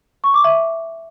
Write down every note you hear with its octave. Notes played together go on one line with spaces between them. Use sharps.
C#6
D6
E5